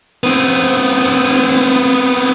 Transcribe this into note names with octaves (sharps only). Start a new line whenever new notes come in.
B3 C4